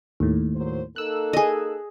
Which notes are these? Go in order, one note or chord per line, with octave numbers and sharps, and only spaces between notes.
D#2 A2
F#3 A#3 C5
A#3 D#4 A4 E6 F#6
G#4 D#5